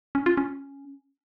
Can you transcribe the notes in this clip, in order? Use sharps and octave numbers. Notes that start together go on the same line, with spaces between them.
C#4
F4
C#4